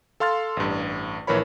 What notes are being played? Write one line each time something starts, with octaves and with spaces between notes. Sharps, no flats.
A4 F5 C6 F6 A6
A1 G2
A#1 E3 A#4 C#5 B5